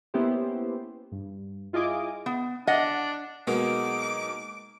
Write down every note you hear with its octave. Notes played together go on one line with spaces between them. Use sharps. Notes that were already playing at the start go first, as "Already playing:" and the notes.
A#3 B3 C#4 E4 G4 C5
G2
E4 F4 G#4 D#5 G#5 D6
B3
D4 D#5 F#5
B2 F#3 G#3 A#3 D#4 B4 D6